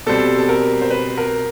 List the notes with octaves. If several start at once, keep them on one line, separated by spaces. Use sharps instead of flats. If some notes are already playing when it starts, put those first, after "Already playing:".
B2 G3 C4 A4
A4
A#4
C5
B4
A#4